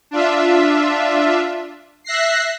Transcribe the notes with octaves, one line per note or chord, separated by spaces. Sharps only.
D4 F4 E5
E5 F#6 A#6 C7